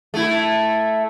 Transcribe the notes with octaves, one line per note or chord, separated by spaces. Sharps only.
A3 E4